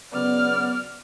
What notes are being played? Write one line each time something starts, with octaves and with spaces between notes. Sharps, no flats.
C#3 F#3 B3 D5 F6